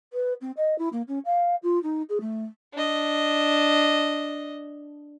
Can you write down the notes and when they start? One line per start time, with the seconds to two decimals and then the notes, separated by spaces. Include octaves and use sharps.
0.13 B4
0.41 C4
0.57 D#5
0.78 E4
0.92 A#3
1.08 C#4
1.25 F5
1.63 F4
1.83 D#4
2.09 G#4
2.21 A3
2.73 D4 D#5